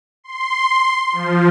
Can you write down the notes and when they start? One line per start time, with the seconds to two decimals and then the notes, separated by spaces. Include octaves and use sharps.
0.24 C6
1.12 F3